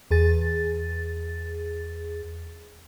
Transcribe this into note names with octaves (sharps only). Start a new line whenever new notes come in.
E2 G#4 A6